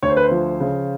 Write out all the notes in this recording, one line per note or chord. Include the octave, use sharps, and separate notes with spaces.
D2 C#5
C5
B4
C5
F3
C#3